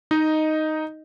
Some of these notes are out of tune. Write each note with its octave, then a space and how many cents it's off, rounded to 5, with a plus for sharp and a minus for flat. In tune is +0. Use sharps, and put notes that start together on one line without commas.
D#4 +0 D#5 +0